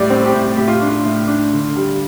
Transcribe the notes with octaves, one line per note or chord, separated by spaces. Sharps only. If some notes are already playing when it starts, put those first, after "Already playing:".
Already playing: A2 G3 D5
C4
G4
A2
A2 G4
F4
D4
F4
A2
D4
D3
G3